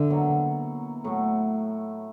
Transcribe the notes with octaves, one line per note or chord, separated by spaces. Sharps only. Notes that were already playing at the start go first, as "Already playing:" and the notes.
Already playing: D3 E4
B2 F#3 A#3
A2 F#3 A3